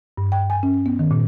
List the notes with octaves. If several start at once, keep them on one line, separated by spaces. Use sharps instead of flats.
G2
G5
G#5
C#4
B3
D#3
A#2